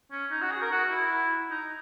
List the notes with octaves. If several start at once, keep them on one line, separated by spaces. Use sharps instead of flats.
C#4
D#4
F#4
G#4
A#4
F#4
E4
D#4